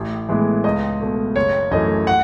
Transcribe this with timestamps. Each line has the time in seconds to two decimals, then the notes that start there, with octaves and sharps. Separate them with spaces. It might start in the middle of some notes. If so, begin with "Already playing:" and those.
Already playing: A1
0.29 A2 E3 G#3 B3
0.64 C#2 D#5
1.00 B2 A3
1.36 F#1 C#5
1.71 F#2 E3 A3 D#5
2.07 F#5